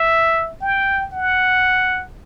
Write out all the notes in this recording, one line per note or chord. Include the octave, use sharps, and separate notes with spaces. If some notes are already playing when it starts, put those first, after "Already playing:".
Already playing: E5
G5
F#5